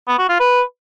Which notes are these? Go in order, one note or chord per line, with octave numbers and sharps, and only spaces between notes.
B3
F#4
F4
B4